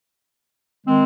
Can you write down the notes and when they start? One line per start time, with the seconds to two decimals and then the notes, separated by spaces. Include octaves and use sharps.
0.87 D#3 G#3 C4